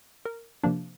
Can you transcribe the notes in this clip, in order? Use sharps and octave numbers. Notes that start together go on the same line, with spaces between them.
A#4
C3 F3 A#3 D4